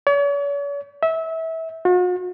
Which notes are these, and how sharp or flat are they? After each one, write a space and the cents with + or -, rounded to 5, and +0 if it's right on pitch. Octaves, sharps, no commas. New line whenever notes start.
C#5 +45
E5 -25
F#4 -45